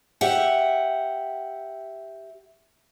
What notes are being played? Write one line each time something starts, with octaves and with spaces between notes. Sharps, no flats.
G4 E5 F#5